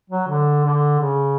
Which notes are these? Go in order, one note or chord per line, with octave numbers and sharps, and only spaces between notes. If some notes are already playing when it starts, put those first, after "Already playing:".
F#3
D3
D3
C#3